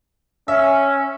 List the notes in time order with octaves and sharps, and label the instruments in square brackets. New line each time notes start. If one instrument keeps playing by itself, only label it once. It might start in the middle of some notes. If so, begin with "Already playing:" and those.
[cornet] C#4 [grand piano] E5